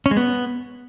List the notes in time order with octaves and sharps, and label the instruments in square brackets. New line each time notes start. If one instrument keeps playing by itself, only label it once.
[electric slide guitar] C#4
G#3
B3